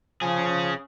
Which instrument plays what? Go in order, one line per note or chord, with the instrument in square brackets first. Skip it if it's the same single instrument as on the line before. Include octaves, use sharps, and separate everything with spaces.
[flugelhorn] F3 [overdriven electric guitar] C#4 G#4